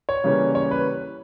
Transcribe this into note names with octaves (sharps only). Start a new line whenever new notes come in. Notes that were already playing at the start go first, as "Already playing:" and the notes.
C#5
C#3 E3 G3 A#3 C#4
C#5
B4